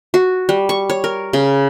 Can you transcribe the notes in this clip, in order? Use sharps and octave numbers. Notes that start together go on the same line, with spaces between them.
F#4
G3
C#6
C#5
A#4
C#3